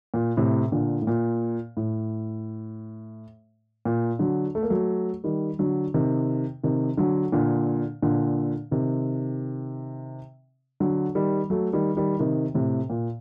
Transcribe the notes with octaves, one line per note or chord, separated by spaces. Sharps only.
A#2
A2 C3
A#2 D3
A2
A#2
A2
A#2
D3 F#3
A3
A#3
F#3 A3
D#3 G3
D3 F#3
C3 D#3
C3 D#3
D3 F#3
A#2 D3
A#2 D3
C3 D#3
D3 F#3
D#3 G3
F#3 A3
D#3 G3
D#3 G3
C3 D#3
A2 C3
A#2